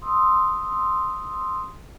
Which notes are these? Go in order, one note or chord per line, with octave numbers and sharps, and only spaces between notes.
C6 D#6 E6